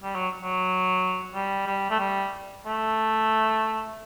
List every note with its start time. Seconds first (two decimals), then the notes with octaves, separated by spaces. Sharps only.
0.03 G3
0.15 F#3
0.40 F#3
1.34 G3
1.66 G3
1.90 A3
1.99 G3
2.66 A3